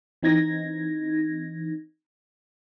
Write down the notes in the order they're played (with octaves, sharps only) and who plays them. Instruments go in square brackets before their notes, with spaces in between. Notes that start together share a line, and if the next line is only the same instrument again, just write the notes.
[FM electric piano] E3 C4 D#4 G#6 A#6